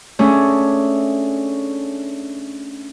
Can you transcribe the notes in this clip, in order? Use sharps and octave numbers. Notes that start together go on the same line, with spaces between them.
A3 C#4 D4 G#4